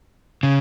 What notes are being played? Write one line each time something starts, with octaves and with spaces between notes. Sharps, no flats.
C#3